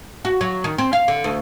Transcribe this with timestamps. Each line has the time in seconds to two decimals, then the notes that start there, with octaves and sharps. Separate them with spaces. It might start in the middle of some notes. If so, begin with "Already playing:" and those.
0.25 F#4
0.41 F#3
0.64 D#3
0.78 C4
0.93 F5
1.08 D3
1.24 D2